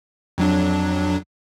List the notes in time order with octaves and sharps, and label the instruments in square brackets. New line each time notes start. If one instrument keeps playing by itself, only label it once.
[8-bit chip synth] F2 F#3 D4